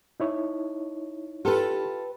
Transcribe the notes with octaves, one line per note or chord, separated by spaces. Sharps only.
D#4 E4 C#5
F4 G4 A4 B4